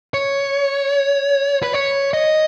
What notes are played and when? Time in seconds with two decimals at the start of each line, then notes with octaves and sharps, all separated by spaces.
0.14 C#5
1.63 B4
1.73 C#5
2.14 D#5